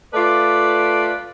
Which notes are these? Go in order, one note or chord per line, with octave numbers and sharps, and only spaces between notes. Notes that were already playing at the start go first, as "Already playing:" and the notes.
A3 F4 B4 D5